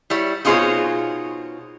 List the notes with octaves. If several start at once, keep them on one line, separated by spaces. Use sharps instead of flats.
G3 E4 C#5
B2 D#4 F4 G#4 C5 C#5